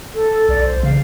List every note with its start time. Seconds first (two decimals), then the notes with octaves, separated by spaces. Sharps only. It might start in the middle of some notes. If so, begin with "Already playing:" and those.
0.14 A4
0.49 B1 D5
0.64 C5
0.83 C#3 F5